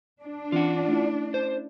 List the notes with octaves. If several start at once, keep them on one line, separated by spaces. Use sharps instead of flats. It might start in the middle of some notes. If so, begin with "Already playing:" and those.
D4
E3 C4 C#4 F4 F#5
A3 C#4 E4
C5